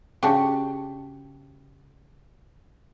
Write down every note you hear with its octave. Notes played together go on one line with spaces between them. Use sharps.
C#3 D4 F#4 G4